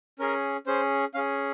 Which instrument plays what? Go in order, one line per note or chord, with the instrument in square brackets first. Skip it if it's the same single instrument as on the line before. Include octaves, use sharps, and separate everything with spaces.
[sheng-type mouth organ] C#4 G#4 A#4
C#4 G#4 C5
C#4 G#4 F5